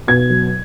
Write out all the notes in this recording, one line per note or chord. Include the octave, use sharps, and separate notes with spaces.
B2 G#6
F#3